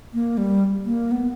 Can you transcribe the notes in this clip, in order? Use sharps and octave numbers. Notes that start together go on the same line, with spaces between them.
A#3
G3
A#3
B3